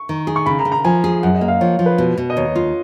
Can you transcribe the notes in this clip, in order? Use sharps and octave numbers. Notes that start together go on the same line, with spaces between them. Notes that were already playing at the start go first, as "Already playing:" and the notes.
Already playing: C#6
D#3
G#4
C#6
C#3 B5
A#5
C#3
A#5
F3 G#5
G#4
F#2 F#5
D#5
A#3
F5
F3 C#5
F3
B4
B2
B2
D#5
D#2 C#5
F4